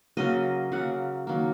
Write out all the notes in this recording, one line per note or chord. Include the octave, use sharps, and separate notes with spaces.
C#3 F#3 A#3 D#5
C#3 F#3 A#3 F#5
D#3 F#3 A#3